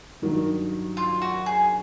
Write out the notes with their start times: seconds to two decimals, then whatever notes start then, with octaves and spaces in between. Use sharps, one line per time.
0.22 G2 D#3 F#3
0.97 F4
1.22 F#4
1.46 G#4